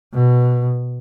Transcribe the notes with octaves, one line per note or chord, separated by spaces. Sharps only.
B2